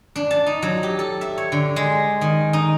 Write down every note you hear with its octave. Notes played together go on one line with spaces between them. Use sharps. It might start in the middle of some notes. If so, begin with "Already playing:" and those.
D4
A5
D#4
F#3
G4
A4
E5
C#5
D3
G#3
D#3
D#4